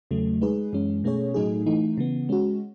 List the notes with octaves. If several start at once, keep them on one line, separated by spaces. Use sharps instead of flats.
E2 C#3 F#3 A3
G#3 D#4 G#4 B4
F#2 E3 G#3 C#4
B2 A3 C#4 G#4 C#5
A2 F#3 A3 D#4 G#4
E3 A3 D#4
C#3 E3 B3
G#3 C#4 F#4